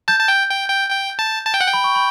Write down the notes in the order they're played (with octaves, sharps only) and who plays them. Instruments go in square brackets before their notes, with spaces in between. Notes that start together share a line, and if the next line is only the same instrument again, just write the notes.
[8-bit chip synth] A5 [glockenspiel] G6
[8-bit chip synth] A5
G5
G5
G5
G5
A5
A5
G5
F#5
G5
[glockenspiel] B5
C#6
B5